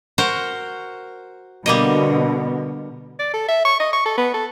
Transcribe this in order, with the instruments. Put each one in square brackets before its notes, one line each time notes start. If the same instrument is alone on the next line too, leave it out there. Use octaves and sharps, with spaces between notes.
[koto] F#4 A#4 C5
[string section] B2 D3 [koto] G3 A#3 D#5
[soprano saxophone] D5
A4
E5
C#6
D#5
C#6
A4
B3
A4